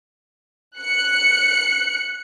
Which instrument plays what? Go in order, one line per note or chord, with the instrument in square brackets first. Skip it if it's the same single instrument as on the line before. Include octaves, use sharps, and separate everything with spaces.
[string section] F#6 C#7